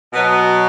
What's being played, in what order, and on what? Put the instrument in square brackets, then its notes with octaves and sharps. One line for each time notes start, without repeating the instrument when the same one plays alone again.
[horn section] B2 F#3 B3